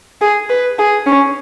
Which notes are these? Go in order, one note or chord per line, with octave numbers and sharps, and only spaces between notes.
G#4
B4
G#4
C#4